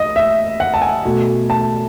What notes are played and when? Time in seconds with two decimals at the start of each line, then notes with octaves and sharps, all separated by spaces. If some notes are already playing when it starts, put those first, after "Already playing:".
Already playing: D#5
0.16 E5
0.60 F#5
0.74 A5
0.82 G#5
1.05 B2 A3
1.50 A5